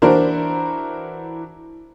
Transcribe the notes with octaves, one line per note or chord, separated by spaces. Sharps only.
E3 D4 E4 F#4 A#4 C5